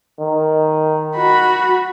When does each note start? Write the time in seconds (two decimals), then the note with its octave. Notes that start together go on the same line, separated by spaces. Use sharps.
0.19 D#3
1.16 F#4 B5